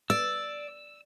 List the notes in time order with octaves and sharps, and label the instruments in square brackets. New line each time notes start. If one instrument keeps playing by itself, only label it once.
[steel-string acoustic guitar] D5 [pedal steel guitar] E6